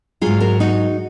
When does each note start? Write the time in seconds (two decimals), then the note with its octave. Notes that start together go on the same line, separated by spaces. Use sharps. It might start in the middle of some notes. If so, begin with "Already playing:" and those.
0.21 G#2 F#3 F4 G#4
0.40 F#4 A#4
0.60 D#4 F#4